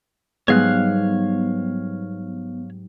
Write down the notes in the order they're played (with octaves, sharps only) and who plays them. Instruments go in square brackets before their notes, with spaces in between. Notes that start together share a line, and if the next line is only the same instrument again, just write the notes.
[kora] G#2 [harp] F#3 G3 D#4 [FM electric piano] B3 [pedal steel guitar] C#5 F5 F#6